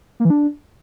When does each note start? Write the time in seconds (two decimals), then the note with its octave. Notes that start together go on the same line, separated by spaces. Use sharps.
0.20 A#3
0.25 E3
0.30 D4